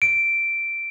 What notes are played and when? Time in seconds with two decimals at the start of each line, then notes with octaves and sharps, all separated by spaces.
0.02 D7